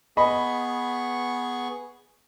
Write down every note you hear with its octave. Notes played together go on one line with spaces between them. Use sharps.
B3 G#4 D#5 B5 C#6